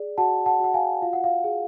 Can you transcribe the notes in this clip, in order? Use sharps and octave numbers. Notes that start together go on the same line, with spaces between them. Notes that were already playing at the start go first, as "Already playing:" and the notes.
Already playing: G#4 D5
F#4 F#5 A5
F#5 A5
F#4 F#5
F5 G#5
F4 F5
F#5
F5
G#4